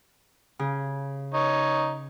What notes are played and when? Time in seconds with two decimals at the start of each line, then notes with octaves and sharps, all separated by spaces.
0.59 C#3
1.34 D#4 C#5